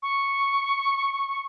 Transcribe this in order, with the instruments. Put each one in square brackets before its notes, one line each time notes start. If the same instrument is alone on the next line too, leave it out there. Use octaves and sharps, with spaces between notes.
[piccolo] C#6